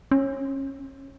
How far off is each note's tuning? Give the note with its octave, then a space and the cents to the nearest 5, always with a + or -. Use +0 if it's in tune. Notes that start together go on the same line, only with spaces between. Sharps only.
C#4 -25